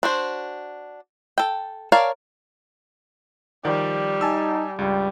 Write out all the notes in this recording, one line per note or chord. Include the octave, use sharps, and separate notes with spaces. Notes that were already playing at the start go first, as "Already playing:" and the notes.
D4 F#4 C5
A4 G5
A#4 C#5 D5 F5 A5
D#3 F3 G3 D5
D#4 G#5 A5 E6
C#2 G2 G3